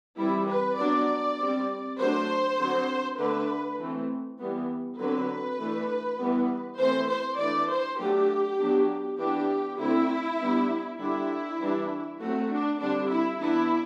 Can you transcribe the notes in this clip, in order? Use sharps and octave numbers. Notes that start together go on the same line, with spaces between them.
E3 G3 C4 E4
B4
F#3 B3 D4 D5
G3 C4
F#3 A3 D4 C5
D3 F#3 C4
D3 A3 D4 B4
E3 A3 C4
E3 G3 B3
D3 F#3 C4 B4
E3 A3 D4
E3 G3 B3
E3 A3 C4 C5
C5
E3 A3 D4 D5
C5
F#3 A3 D4 G4
F#3 B3 D4
E3 B3 D4 G4
D3 A3 C4 E4
G3 B3 D4
D3 G3 D4 E4
E3 G3 D4
F#3 A3 C4 F#4
D4
D3 G3 C4 D4
E4
E3 B3 D4 E4